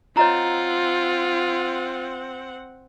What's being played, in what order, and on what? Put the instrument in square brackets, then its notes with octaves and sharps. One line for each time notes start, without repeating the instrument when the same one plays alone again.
[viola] C4 F#5 [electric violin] F4 [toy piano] C#5 D#5 A#5